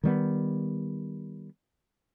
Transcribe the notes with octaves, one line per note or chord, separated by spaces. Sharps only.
D#3 G3 B3